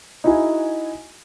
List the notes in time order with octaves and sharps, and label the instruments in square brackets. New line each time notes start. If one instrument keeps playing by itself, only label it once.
[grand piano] D#4 E4 F#4 G#4 G#5